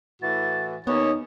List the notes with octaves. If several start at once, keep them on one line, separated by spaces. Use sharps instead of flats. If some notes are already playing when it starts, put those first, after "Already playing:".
A2 E3 F#4 A6
D#2 B3 C#4 D#4 C#5 D#6